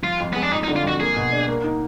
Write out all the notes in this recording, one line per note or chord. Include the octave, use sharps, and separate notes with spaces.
F3 F4
F2
G#3 B3
D4
F2 D#4
D#4
D3
F4
F2 F#4
A#3 G#4
B2
D4
A#3
D#4